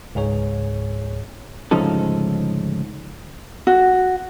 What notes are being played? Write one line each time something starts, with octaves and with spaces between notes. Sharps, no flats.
C#2 G#2 G#4 C#5
D2 G#2 C#3 F3 D#4 A4
F#4